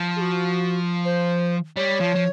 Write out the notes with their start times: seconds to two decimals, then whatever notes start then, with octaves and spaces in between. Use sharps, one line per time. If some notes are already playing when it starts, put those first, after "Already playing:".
Already playing: F3
0.16 G#4
0.21 F#4
1.05 C5
1.77 G3 C#5
2.01 F3
2.16 F3